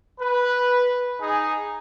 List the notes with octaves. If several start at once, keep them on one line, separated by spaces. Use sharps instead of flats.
B4
D#4 G#4